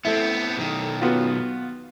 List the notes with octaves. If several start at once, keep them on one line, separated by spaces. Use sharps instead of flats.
A3 B3 C4 E4
B1 D#3
B3 F4 F#4